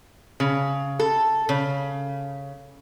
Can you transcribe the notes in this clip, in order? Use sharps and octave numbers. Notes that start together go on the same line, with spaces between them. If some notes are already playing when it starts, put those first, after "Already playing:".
C#3
A4
C#3